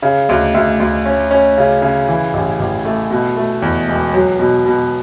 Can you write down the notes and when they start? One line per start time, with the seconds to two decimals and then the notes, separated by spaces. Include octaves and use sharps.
0.02 C#3
0.29 D2
0.54 D2
0.80 D2
1.05 C#4
1.31 C#4
1.57 C#3
1.82 C#3
2.09 E3
2.34 A1
2.60 A1
2.85 A3
3.10 B2
3.37 A3
3.62 E2
3.88 E1
4.14 F#3
4.39 B2
4.66 B2